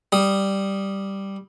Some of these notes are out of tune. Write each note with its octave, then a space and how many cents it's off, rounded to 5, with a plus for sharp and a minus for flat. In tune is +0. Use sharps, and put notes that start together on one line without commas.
G3 +0 D#6 +0